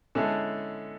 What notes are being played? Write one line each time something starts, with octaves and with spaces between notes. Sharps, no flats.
D3 G#3 C#4 E4 A4